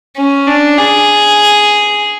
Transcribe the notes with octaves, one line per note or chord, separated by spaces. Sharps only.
C#4
D4
G#4